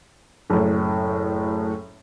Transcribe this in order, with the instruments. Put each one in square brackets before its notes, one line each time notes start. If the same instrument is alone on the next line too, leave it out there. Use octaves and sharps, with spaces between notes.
[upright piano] F#1 A2